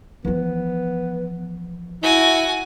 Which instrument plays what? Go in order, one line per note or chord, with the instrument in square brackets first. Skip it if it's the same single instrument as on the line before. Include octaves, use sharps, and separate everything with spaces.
[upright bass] E3 F3 [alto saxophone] B3
[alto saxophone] E4 [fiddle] F#4 G#5